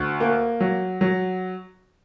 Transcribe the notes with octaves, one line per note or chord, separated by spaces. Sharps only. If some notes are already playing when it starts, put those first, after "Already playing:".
Already playing: D2
A#3
F#3
F#3